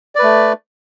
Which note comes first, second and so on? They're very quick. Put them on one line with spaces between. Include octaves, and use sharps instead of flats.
D5 B4 A3